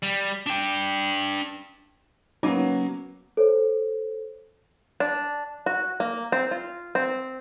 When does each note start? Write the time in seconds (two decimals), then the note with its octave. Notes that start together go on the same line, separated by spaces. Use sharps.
0.03 G3
0.46 D4 G5
2.43 F#3 A#3 B3 C#4 D#4 D6 D#7
3.37 A4 C5 C#5
5.00 D4
5.66 F#4
6.00 A#3
6.32 C4
6.51 F4
6.95 C4